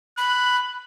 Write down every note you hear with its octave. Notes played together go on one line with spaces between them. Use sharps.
B5 F#6